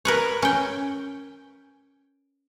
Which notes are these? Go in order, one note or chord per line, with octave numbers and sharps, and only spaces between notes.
A#4 B4 C#5
C#4 G5